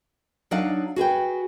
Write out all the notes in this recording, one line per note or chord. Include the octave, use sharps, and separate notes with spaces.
F#3 D4 D#4 F5 F#5
F#4 G#4 B4 G5